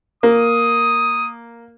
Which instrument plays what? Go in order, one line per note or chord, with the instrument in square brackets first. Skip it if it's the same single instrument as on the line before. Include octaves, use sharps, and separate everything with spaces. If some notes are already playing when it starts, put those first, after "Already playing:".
[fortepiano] A#3 [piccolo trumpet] D#6